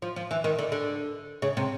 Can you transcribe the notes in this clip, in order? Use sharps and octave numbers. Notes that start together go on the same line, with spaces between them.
F3
F3
E3
D#3
D3
D3
C#3
C3